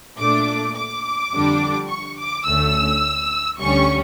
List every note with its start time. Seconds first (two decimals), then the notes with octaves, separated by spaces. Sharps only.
0.17 A#2 A3 D4 D6
0.76 D6
1.33 F2 D3 G3 D4
1.89 C#6
2.18 D6
2.45 D2 D3 A3 C#4 E6
3.60 D2 D3 G3 C#4 C#6